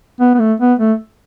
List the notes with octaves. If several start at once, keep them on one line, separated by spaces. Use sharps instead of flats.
B3
B3
A3
B3
A3